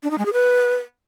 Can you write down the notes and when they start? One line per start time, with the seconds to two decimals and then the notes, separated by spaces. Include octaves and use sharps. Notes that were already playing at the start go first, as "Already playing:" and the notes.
0.03 D4
0.11 D#4
0.18 G#3
0.26 G#4
0.33 B4